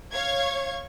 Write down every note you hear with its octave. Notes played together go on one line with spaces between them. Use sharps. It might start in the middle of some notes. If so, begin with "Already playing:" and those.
C#5 F5 C#6 G#6